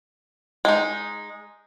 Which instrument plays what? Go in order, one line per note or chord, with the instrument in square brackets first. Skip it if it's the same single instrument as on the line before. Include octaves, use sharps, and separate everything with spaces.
[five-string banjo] G#3 D#4